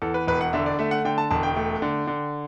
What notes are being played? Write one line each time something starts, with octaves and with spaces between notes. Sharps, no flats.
E2 A4
B4
E1 B4
F#5
D3 E5
D5
A3 E5
F#5
D3 G5
A5
E1 A5
G5
A3
D3
D3